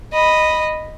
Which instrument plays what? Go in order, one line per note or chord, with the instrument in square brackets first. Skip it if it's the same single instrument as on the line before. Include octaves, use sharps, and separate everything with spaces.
[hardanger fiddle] D#5 B5